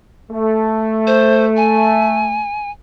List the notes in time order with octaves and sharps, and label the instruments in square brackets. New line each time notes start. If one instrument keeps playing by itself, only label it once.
[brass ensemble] A3
[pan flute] C5
G#5